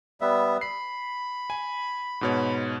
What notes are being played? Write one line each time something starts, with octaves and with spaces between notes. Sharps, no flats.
G3 B3 E5
B5 C7
G#5
G#2 B2 C#5